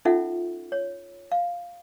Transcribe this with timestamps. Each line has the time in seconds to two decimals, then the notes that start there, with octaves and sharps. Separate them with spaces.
0.05 C#4 D#4 F4 A4 E5 F#5
0.72 C#5
1.32 F5